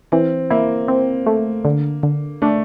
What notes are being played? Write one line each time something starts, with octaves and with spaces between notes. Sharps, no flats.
E3 C4
A#3 E4
C4
A3
D3
D3
A3 D4